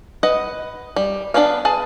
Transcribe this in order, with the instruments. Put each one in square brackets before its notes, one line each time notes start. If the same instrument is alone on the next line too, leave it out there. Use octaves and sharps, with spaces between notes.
[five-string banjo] B4 D#5 F#5
G3
B3 D4 B4 C#5 F5
G#4 B4 A5